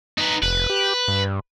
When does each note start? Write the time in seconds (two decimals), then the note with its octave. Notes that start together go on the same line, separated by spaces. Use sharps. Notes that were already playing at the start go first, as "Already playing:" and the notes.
0.18 D#4 B4
0.42 F1 B4
0.70 G4
1.08 G2